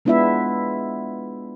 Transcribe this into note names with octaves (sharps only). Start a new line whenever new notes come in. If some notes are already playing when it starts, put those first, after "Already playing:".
G#3 B3 D4 E4 F4 E5